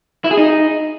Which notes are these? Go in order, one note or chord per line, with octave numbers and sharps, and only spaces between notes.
E4
G#4
D#4